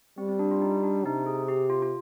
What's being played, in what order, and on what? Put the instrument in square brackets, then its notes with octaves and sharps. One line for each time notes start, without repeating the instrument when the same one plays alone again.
[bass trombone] G3 [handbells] C4
[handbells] C4
D4
F4
D#4
D4
[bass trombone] C3 [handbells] D#4
[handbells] G#4
G4
F4
F4